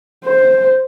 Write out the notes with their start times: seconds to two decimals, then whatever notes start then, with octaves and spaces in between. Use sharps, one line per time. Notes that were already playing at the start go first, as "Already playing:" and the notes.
0.24 C5